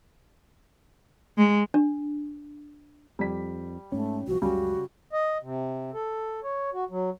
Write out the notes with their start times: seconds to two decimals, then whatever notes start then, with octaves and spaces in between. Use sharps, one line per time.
1.38 G#3
1.74 D4
3.19 F2 G3 D5 B6
3.92 G#2 A3 C#4
4.27 C2 F3 F#4
4.42 C#2 F#2 C#3 G3 C#4 F#4
5.13 D#5
5.43 C3
5.94 A4
6.44 C#5
6.73 F#4
6.91 F#3